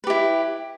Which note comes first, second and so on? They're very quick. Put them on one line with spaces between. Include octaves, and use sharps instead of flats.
B4 G4 E4